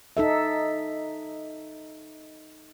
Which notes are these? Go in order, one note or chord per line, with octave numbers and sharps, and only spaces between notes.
D#4 A4 E5